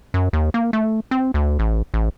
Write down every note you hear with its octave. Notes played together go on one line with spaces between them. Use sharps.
F#2
D#2
A#3
A3
C4
D2
A1
A1